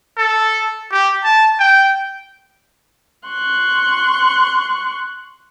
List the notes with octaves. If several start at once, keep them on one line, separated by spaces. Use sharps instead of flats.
A4
G4
A5
G5
C6 C#6 F#6